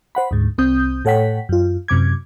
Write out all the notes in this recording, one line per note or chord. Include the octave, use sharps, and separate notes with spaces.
C5 F#5 B5
D2 G#2
C2 C4 D#6 G6
A2 A4 C#5 F#5 G5 B6
F#2 F4
F#2 C3 D6 G#6